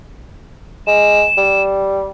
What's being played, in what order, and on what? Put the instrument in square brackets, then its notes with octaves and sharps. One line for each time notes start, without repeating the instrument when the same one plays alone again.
[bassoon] G#3 [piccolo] E7
[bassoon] G3